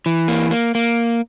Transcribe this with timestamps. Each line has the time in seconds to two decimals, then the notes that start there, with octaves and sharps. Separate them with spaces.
0.06 E3
0.28 A#3
0.51 A#3
0.75 A#3